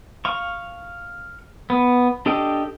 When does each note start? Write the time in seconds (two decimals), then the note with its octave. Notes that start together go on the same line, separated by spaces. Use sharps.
0.25 F5 C#6
1.70 B3
2.26 D4 G4 A4 D#5 G5